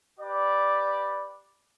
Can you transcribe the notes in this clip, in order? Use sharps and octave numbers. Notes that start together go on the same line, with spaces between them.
G4 B4 D5